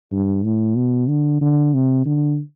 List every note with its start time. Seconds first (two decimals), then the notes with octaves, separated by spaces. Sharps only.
0.12 G2
0.45 A2
0.77 B2
1.09 D3
1.41 D3
1.74 C3
2.06 D3